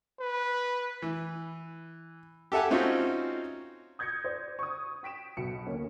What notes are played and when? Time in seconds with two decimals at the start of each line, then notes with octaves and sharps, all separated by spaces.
0.20 B4
1.02 E3
2.52 G4 A4 E5 F#5 G#5
2.71 C4 C#4 D#4 F4 F#4 C5
3.99 D#6 G6 G#6 A#6 C#7
4.24 C5 D5
4.59 C#6 D#6
5.03 G5 B6 D7 E7
5.37 B1 B2 C#7
5.67 D2 A#3 C#4